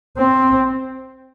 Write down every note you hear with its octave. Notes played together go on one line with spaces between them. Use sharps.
C4